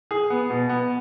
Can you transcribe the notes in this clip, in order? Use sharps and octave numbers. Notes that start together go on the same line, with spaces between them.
G#4
B3
B2
B3